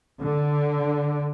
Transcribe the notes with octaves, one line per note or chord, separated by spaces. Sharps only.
D3